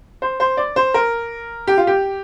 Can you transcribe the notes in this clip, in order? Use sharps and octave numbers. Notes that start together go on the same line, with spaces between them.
C5
C5
D5
C5
A#4
G4
F4
G4